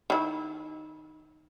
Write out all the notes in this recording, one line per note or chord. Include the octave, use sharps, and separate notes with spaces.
D#3 E4